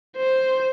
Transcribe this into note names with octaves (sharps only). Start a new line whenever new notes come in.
C5